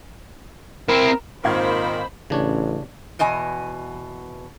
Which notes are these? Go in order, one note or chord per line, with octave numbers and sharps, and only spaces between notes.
C4 E4 A#4
G#1 A#2 D#3 C5 F5 B5 G#6
A1 C#3 D4 C#5
E2 B2 D#5 G#5